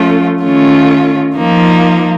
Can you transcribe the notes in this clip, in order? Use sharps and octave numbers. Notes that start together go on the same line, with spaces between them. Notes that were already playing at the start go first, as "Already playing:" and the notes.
Already playing: F3 A3 C#4 F4
D#3 A3 C#4 F4
F3 A#3 D#4